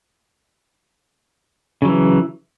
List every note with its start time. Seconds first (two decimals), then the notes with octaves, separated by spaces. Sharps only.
1.82 C#3
1.85 F#3
1.88 E3